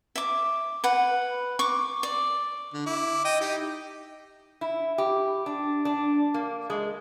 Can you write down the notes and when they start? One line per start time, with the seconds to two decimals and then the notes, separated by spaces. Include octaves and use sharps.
0.16 E5 D6
0.84 B4 F#5
1.59 C#6 D6
2.03 D5
2.73 D3
2.86 E4 D6
3.24 D#5 G5
3.41 D#4 G4
4.61 E4
4.98 G4
5.46 D4
5.85 D4
6.34 A#3
6.70 G#3